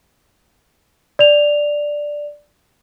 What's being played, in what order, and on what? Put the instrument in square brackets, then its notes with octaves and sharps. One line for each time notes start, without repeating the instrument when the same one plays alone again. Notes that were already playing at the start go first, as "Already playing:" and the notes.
[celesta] D5 F7